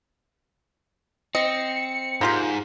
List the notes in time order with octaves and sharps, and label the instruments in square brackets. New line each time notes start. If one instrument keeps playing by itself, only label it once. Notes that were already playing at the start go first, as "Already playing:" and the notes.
[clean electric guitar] C4 [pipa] D#5 [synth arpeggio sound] C#7
[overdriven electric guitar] G#2 [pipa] A#3 F4 G4